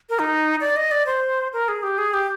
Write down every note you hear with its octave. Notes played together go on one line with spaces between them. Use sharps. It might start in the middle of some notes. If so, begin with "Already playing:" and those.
A#4
D#4
D5
D#5
D5
C5
A#4
G#4
G4
G#4
G4